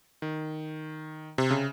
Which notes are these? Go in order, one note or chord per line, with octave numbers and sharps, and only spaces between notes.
D#3
C3
C#3